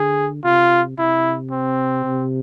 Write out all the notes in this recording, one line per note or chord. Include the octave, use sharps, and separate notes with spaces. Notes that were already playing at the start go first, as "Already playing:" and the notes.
Already playing: D3 G#4
C3 F4
C3 E4
C4
C3